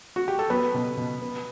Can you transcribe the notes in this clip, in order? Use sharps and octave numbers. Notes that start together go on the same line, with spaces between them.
F#4
G4
A4
F#3 B3 B4
B2
B2
B3